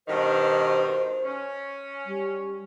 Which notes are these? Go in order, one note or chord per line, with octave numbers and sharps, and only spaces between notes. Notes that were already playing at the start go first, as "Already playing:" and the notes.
G2 B2 D#3 C5
C#4
G3